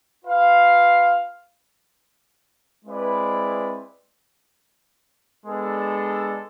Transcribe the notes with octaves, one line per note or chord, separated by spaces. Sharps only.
F4 B4 F5
G#3 C4 E4 B4 D5
G#3 B3 D4 A4 D5